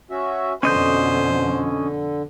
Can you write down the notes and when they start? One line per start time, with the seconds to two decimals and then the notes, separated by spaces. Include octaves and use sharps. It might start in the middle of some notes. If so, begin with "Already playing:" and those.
0.11 C#4 F#4 E5
0.63 F2 B2 D3 C#4 C5 D#5 G6